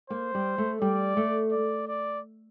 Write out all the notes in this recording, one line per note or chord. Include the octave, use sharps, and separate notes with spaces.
A#3 C5
G3
A3
G3 D5
A3
D5
D5